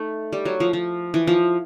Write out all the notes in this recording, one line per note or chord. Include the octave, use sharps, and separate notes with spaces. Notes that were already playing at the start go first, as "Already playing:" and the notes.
Already playing: A3 D#4
G3
F#3
F3
F3
E3
F3